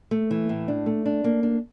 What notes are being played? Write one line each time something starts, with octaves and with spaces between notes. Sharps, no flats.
A3
E3
A2
D4
A3
D4
A#3
D4